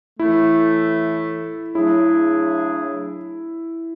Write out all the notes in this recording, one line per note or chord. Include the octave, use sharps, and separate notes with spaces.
A2 E3 A3 E4
C#3 F#3 A3 D4 E4 G#4